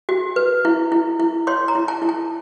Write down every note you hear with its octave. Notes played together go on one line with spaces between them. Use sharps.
F#4
B4
E4
E4
E4
C#5 C6
A#5
E4
A5
E4
A5